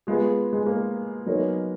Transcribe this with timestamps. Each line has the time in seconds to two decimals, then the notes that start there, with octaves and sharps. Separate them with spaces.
0.07 G#3 B3 F4 G#4
0.53 G#3
0.66 A#3
1.26 F#3 B3 D#4 A#4 C#5